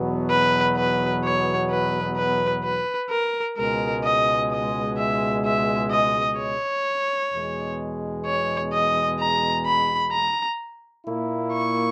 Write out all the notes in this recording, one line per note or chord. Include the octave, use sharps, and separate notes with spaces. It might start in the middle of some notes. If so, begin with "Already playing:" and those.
Already playing: E2 B2 F#3 B3
B4
B4
C#5
B4
B4
B4
A#4
C#2 B2 G#3 A#4
D#5
D#5
E5
E5
D#5
C#5
E2 B2 G#3
C#5
D#5
A#5
B5
A#5
A#2 A#3 E4
C#6